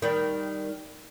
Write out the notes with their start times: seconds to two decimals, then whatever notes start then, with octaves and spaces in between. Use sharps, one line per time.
0.02 D#3 G3